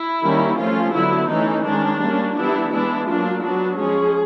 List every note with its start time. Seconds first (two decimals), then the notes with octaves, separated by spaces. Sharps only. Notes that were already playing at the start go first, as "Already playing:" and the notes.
Already playing: E4
0.22 D#3 G3 A#3 C#4
0.57 F3 A3 C#4 F4
0.92 D3 F#3 B3 E4
1.28 E3 A3 C#4 D#4
1.64 D#3 G#3 C#4 D4
1.99 G3 A#3 C#4
2.35 E3 G3 B3 D4 E4
2.71 E3 G#3 B3 D4 E4
3.07 F#3 A#3 D4 F4
3.42 F#3 B3 D4 F#4
3.78 F3 G#3 C#4 G#4